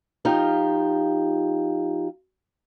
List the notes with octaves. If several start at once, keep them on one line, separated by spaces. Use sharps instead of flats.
F3 D#4 F4 G4